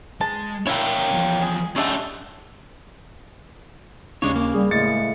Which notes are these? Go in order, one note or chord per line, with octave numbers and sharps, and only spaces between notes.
G#3 A5
D4 E4 A#4 C#5 F5 G5
E2 F3
G#4
G#3 C#4 D4 G4 D5 E5 F#5 A5
D#2 C#3 G#3 D4 C#5
A#3
G3 G#4
A2 C#3 G#3 A3 A6 C#7